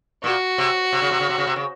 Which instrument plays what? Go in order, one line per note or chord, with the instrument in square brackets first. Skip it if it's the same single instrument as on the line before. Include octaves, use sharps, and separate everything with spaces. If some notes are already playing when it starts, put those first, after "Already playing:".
[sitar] A#2 [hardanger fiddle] F#4
[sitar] C3
C3
C#3
C3
C#3
C3
C#3
C3
C#3